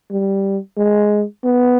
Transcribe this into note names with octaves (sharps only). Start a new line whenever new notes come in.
G3
G#3
B3